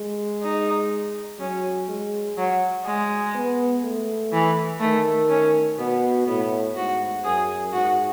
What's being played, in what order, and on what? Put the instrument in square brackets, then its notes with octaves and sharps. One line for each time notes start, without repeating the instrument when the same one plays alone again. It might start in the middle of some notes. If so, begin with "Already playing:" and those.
Already playing: [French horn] G#3
[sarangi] D#4
[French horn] F#3 [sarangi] C#4
[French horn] G#3
[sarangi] F#3
G#3
[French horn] B3
A3
[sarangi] E3
[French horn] D#3 [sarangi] A3
[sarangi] C#4
[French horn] B2 [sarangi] B3
[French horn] A2 [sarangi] B3
[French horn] G#2 [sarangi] F#4
[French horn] F#2 [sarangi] G#4
[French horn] G#2 [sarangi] F#4